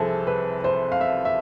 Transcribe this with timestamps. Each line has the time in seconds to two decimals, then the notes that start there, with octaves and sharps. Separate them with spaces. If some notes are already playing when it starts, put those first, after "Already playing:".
Already playing: C2 C3 F3 G#4 A4
0.27 B4
0.64 C5
0.92 F5
1.01 E5
1.25 E5